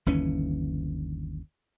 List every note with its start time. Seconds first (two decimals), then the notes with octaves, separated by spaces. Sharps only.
0.06 G1 D#2 E3 C#4